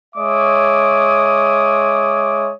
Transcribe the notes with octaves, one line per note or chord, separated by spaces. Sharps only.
G#3 C#5 E5 D6 D#6